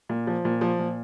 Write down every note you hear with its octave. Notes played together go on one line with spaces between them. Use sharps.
A#2
F3
A#2
F3
A#2